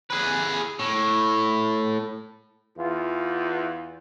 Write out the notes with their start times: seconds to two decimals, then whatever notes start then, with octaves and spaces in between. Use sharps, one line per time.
0.10 G#4 B4
0.80 A2
2.78 E2 F4